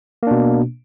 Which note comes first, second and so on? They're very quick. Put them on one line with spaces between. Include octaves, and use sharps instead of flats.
A#3 D4 B2